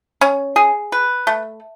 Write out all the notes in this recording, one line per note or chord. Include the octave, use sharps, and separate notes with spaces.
C#4
G#4
B4
A3